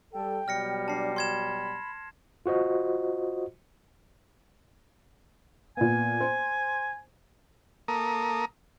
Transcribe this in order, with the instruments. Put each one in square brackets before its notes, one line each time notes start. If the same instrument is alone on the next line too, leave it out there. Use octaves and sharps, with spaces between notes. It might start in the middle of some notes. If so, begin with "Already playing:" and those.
[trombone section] G3 A4 [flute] G5
[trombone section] B2 F#3 G3 [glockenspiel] F6 A#6 C#7
[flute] D4 [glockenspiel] A5 C7
[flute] B5 [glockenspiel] C6 G#6 E7
[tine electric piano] F4 F#4 C5 D#5
[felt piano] A#2 B3 [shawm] G#5
[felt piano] C5
[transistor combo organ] A#3 A4 A#5 D#6